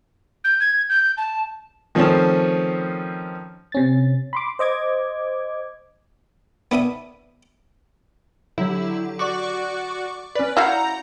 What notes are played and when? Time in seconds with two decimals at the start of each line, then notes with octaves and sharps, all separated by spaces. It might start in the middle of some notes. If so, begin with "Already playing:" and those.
0.44 G6
0.60 G#6
0.89 G6
1.17 A5
1.95 D#3 F3 A3 C4 C#4 A5
3.72 C3 C#4 A6
4.33 B5 C6 D6
4.59 C5 D#5 D6 G#6
6.71 B3 D4 E5 D#6
8.58 D3 F#3 E4 G4
9.19 F#4 D5 C#6 D6
10.35 C#4 B4 D5
10.57 E4 F#4 F5 A#5 G6 C#7